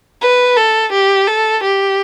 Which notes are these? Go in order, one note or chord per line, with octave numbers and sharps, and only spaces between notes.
B4
A4
G4
A4
G4